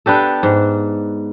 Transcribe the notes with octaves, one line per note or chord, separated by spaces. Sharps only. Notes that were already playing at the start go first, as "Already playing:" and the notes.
B3 D4 G4 A4
G#2